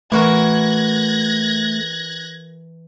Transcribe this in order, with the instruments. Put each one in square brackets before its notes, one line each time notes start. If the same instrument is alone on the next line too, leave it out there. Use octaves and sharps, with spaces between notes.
[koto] E3 F#4 A#4 [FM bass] A3 [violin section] F#6 G#6 A#6